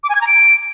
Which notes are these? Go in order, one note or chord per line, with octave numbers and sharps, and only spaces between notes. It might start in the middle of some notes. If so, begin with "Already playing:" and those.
D6
G#5
G#6
A#5
D7